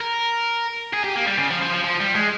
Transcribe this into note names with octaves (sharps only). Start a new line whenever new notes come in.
A#4
G#4
G4
A#3
G3
C#3
F3
F3
F3
F3
G3
G#3